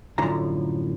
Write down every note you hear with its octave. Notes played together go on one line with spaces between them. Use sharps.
F#2 A2 D3 F3 A#5